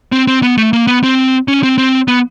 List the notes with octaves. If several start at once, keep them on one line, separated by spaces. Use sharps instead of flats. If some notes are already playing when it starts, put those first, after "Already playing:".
C4
C4
B3
A3
A#3
B3
C4
C#4
C4
C4
B3